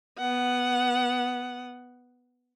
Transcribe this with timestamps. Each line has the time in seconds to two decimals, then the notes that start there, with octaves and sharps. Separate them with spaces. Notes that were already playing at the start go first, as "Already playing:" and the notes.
0.18 B3 F#5